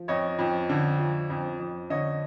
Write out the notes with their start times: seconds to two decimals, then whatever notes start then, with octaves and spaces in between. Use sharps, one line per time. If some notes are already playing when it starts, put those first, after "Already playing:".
Already playing: F3
0.08 F2 C#5 D#5
0.39 F2
0.69 D3
0.99 F3
1.30 F2
1.60 F2
1.90 D3 C#5 D#5